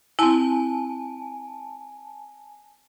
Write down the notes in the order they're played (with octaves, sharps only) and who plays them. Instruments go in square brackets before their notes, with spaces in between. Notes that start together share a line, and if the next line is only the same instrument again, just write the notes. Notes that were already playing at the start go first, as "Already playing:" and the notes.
[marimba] C4 E4 [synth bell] G#5 A5